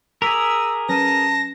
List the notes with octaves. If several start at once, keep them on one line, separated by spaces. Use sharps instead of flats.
G#4 A#4 D6 E6 F6 B6
F#3 C#4 B4 A5 A#6